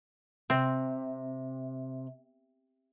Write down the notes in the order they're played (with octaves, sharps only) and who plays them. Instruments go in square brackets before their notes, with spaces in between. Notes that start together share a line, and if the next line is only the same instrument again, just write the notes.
[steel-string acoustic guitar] C3 [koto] C4